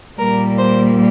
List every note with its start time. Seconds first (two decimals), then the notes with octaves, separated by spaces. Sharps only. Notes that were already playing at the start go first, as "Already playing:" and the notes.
0.18 A#2 G3 A#3 A#4
0.57 C5